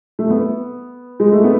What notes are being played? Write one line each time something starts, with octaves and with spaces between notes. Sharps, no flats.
A3
B3
G#3
A3
B3